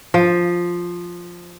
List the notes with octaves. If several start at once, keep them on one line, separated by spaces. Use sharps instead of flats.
F3